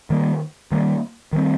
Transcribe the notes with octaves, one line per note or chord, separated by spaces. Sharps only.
D#3 G3 A#3
D#3 G3 A#3
D#3 G3 C4